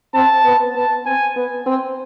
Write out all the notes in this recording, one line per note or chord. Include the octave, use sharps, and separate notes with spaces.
C4 A5
B3
B3 A5
C4 G#5
B3
C4